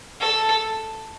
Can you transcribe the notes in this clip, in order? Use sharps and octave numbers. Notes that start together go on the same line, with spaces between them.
A4